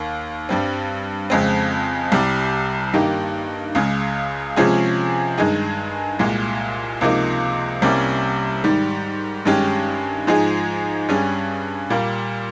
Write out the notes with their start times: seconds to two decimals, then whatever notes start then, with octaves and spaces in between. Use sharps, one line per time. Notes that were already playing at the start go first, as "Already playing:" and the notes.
Already playing: D#2 A#3
0.49 G2 G3 C4
1.30 F2 C#3 G#3 C4
2.12 C2 C3 G3
2.93 G2 D#3 A#3 D#4 G4
3.75 C#2 C#3 G#3
4.56 C3 F3 G#3 C#4 G#4
5.38 G2 D#3 G#3 D#4 G#4
6.19 C2 A#2 G#3
7.01 C#2 C3 F3 A#3 D#4
7.82 C2 C3 G3 A#3 C#4
8.64 G#2 D#3 G3
9.45 G2 D#3 G#3 C#4 G4
10.27 G#2 F3 G#3 D#4 G#4
11.09 G2 G3 C#4 G#4
11.90 A#2 G3 A#3